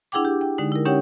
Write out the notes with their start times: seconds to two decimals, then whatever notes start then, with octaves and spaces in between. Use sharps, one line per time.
0.12 D4 E4 G#4 F#5 G5 D6
0.25 G4
0.41 G5
0.58 D3 G#3 D#4
0.72 E4 A#4
0.85 C#4 D#4 G4 C#5 F#5 G5